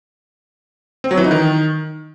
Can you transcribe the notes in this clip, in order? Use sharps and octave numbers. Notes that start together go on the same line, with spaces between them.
C4
F#3
E3
D#4
D#3